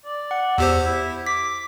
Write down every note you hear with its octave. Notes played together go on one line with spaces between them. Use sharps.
D5
F#5
E2 G4 C5 E6
E4
D6 B6